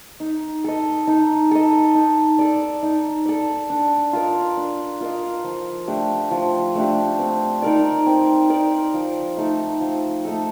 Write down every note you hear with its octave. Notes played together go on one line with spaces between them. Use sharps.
D#4
A4 D#5
D#4
A4 D#5
D#4
A4 D5
D#4
A4 D5
D4
F4 A#4 D#5
D4
F4 A#4 D#5
F3
A3 D4 G4
F3
A3 D4 G4
C4
D#4 A#4 D5
C4
D#4 A#4 D5
F3
A3 D#4 A4
F3
A3 D#4 A4